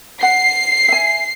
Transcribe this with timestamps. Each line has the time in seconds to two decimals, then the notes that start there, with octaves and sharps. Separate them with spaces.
0.23 F#5 C7
0.88 E5 G#5